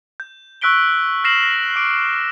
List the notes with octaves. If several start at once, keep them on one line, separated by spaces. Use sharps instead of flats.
G6
C#6 E6 F#6 B6 D7 G7
F6 A#6 C7 E7 F#7
A#6
D6 D7